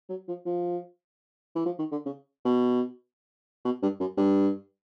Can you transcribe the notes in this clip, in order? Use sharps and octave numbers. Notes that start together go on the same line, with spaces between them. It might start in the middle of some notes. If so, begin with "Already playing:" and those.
F#3
F3
F3
E3
F3
D#3
D3
C#3
B2
B2
G2
F#2
G2